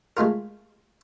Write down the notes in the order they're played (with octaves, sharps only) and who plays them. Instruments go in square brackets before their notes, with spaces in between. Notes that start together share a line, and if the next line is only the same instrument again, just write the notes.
[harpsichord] G#3 A3 F4 A#4